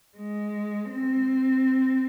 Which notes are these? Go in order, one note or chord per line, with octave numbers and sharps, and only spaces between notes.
G#3
C4